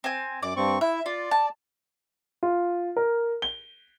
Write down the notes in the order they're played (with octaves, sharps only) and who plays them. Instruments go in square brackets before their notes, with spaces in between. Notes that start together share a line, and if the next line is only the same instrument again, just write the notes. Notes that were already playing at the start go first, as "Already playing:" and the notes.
[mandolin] C4 G#5
[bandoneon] F#2 D6 [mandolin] D5
[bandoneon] G2 C4 C#6
[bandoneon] E4 [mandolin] E5
[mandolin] F4 [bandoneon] D5
[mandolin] A5
[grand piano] F4
A#4
G7